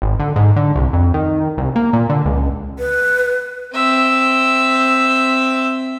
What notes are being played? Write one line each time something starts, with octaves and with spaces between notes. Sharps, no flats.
G#1
D3
G#2
D3
C2
F2
D#3
C2
A#3
A#2
D3
C#2
B4
C4 E5